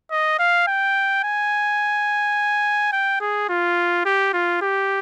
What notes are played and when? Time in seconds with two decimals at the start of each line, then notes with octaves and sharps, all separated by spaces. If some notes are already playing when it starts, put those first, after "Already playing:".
0.11 D#5
0.39 F5
0.68 G5
1.24 G#5
2.93 G5
3.21 G#4
3.49 F4
4.05 G4
4.34 F4
4.62 G4